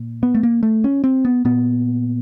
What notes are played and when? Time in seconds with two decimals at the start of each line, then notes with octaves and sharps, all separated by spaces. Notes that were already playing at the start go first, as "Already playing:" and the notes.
Already playing: A#2
0.23 B3
0.35 A3
0.43 A#3
0.63 A3
0.84 C#4
1.04 C4
1.25 B3
1.45 A#2 B3